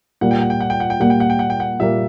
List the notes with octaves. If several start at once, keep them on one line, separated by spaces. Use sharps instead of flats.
A#2 G3 A#3 F#5
G5
F#5
G5
F#5
G5
F#5
G5
A#2 G3 A#3 F#5
G5
F#5
G5
F#5
G5
F#5
A#2 G3 A#3 E5